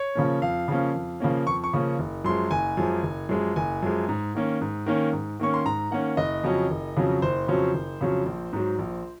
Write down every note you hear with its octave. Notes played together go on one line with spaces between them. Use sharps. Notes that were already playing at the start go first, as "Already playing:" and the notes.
Already playing: C#5
C#3 F3 A#3 C#4
F2 F5
C#3 F3 A#3 C#4
F2
C#3 F3 A#3 C#4
F2 C#6
C#6
C#3 F3 A#3 C#4
F#1
F#2 F3 G#3 C6
F#1 G#5
F#2 F3 G#3
F#1
F#2 F3 G#3
F#1 G#5
F#2 F3 G#3
G#2
D#3 A#3 C#4
G#2
D#3 A#3 C#4
G#2
D#3 A#3 C#4 C#6
C6
G#2 A#5
D#3 A#3 C#4 F#5
F#1 D#5
F2 C#3 F#3 C#4
F#1
F2 C#3 F#3 C#4
F#1 C5
F2 C#3 F#3 C#4
F#1
F2 C#3 F#3 C#4
A#1
G#2 F#3
A#1